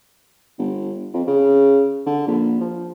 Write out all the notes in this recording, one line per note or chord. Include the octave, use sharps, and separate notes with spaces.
G1
F2
C#3
D3
A#1
F3